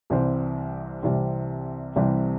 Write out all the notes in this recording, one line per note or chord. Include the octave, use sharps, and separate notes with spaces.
C2 C3 E3 G3 C4
C2 C3 E3 G3 C4
C2 C3 E3 G3 C4